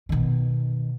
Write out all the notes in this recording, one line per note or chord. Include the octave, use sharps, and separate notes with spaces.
B2 D#3